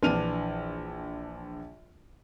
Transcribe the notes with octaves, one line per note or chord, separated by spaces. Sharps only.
A#1 E3 D4 F6 D#7 F7